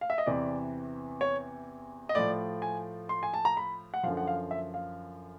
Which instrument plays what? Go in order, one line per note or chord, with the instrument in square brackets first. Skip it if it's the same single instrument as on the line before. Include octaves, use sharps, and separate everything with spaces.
[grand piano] F5
E5
D#5
E2 C3 E3 D5
C#5
D#5
A2 F3 D5
G#5
C6
G#5
A5
A#5
B5
F#5
F#2 D3 F3 F5
F#5
F5
E5
F5